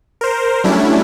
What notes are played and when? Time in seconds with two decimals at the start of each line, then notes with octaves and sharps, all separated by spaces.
0.21 A#4 C5
0.64 F#3 G3 A3 C#4 D4 E4